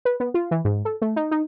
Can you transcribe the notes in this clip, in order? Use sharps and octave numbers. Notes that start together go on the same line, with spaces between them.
B4
B3
F4
E3
G#2
A4
A3
D#4
D#4